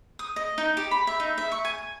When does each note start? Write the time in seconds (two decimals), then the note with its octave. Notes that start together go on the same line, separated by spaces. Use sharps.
0.19 D#6
0.36 D#5
0.58 D#4
0.77 G4
0.91 B5
1.07 E5
1.20 D#4
1.38 E5
1.52 C#6
1.65 G#5